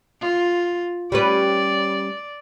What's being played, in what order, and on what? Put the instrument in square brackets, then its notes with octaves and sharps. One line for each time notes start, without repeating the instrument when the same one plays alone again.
[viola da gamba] F4
[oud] G3 C#4 B4 [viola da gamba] D5